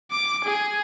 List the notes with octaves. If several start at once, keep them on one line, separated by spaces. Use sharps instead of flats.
D6
G#4